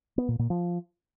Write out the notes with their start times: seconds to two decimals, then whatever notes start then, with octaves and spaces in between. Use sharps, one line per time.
0.18 B3
0.28 A#2
0.39 A#2
0.50 F3